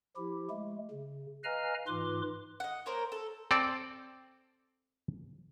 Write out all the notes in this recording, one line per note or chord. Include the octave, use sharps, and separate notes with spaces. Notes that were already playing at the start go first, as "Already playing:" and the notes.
F3 E4 G4
G#3 A3
C#3
B4 D#5 F5 G#5 A#5 F6
G#2 E3 F4 B4 C6 D6
D#5 F#5
A#3 A#4 C5 C#5
A4
C4 A4 D5